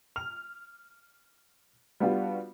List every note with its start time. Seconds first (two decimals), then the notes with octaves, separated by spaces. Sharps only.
0.16 F6 F7
2.00 G3 B3 D4 F4 F#4